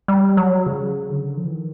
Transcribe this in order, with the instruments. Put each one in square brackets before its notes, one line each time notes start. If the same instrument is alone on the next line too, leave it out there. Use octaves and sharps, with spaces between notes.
[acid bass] G3
F#3
C#3
D3
F3
E3
D#3